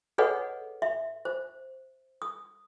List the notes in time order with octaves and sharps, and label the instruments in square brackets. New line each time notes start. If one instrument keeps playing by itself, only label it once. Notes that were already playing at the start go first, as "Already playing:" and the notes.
[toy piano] G#4 A4 B4 C#5 D#5 F#5
E5
C5
D#6